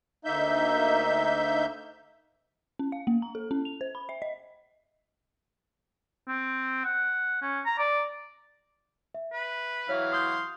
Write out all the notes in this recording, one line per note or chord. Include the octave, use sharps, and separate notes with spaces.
D2 A#3 D#4 E5 G6
C#4
F5
A#3
A#5
A4
C#4
F7
C5
B5
E5
D#5
C4
F#5
C#4
A#5
D5
E5
B4
E3 F#3 C#5 E5 F5
C6 D#6 G6